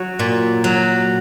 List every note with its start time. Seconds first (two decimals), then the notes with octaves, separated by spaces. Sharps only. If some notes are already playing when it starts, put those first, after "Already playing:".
Already playing: F#3 C#5
0.19 A#2
0.64 F#3